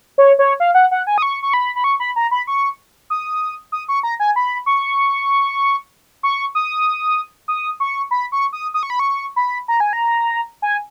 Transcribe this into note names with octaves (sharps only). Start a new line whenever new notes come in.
C#5
C#5
F5
F#5
F#5
G#5
D#6
C#6
C#6
B5
B5
C#6
B5
A#5
B5
C#6
D#6
D#6
C#6
A#5
G#5
B5
C#6
C#6
D#6
D#6
C#6
B5
C#6
D#6
D#6
C#6
B5
C#6
B5
A#5
G#5
A#5
G#5